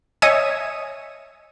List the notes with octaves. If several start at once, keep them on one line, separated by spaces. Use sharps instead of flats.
C#5 D#5 E5 G#5 D#6 E6